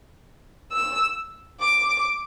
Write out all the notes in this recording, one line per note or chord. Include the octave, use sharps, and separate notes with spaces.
E6
D6